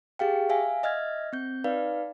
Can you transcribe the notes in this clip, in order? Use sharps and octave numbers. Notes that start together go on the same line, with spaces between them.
G4 G#4 F5 G5
E5 F5 G#5
D#5 E5 F6 G#6
C4 G6
D#4 B4 D5 F5